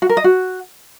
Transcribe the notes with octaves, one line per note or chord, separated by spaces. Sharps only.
F#4
A#4
D#5
F#4